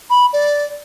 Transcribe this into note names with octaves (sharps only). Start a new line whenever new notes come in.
B5
D5